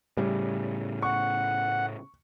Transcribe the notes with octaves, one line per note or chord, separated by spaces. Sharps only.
A2 C#3 G3
F#5 C#6